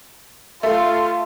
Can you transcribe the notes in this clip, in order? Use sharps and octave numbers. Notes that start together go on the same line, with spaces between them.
A3 F4